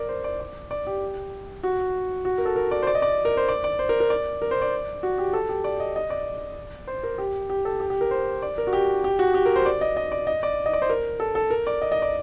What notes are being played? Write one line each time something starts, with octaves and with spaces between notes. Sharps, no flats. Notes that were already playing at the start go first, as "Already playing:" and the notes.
Already playing: A#4 D5
C5
D5
D5
D5
G4
F#4
F#4
A#4
A4
A#4
D5
C5
D5
D#5
D5
A#4
C5
D5
D5
C5
A#4
A#4
D5
A#4
C5
D5
F#4
G4
A4
G4
D5
D#5
D#5
D5
C5
A#4
G4
G4
A4
G4
G4
A#4
C5
D5
A#4
F#4
G4
G4
F#4
G4
A#4
C5
D5
D#5
D#5
D5
D#5
D5
D#5
D5
C5
A#4
A4
A4
A#4
D5
D#5
D#5
D5